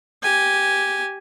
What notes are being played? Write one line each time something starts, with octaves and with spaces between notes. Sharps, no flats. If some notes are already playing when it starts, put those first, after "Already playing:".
G4 G#5